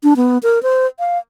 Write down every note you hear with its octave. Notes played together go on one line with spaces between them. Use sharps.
D4
B3
A#4
C5
F5